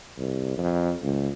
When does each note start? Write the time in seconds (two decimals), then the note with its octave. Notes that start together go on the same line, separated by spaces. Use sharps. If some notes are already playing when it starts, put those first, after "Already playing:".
0.18 C2
0.58 F2
1.02 C#2